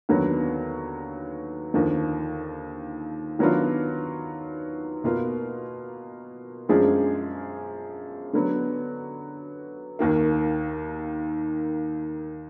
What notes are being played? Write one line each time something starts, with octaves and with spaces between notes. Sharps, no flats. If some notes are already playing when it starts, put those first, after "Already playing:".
D#2 D3 F#3 B3
D#2 D3 F3
D#3 F#3 B3 D4 F4
B2 A#3 F4 B4
F#2 F3 G#3 D4 G#4
D3 F#3 B3
D#2 D#3 A#3